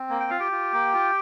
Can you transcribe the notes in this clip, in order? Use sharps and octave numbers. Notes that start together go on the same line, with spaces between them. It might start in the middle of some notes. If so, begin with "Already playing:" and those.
Already playing: C4
A#3
G5
F4 F5
G4 G5
F4
A#3
F4